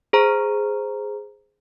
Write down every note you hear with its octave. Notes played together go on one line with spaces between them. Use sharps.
G#4 C5 A#5